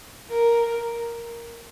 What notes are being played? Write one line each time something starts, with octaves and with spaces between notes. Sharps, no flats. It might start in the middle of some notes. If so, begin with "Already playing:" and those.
A#4